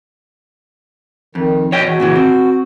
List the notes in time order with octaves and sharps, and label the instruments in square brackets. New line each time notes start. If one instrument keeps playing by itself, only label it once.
[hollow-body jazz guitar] F2 [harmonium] D#3
[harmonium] B2 [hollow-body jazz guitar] C#5 D#5 G5
[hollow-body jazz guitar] E2 [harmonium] F#4
[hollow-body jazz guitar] A#2 C#3 E3
C4